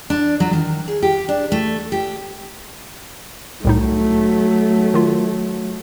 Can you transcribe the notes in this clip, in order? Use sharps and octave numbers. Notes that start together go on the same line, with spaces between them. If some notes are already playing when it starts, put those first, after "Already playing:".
D4
F#3
D#3
G#4
G4
D4
A3
G4
C2 A2 F#3 A3 D#4
D#3 F4